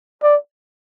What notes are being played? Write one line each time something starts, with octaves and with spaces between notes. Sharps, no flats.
D5